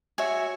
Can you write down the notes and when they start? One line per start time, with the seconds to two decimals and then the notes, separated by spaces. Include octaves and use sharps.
0.18 F#4 C#5 E5 G#5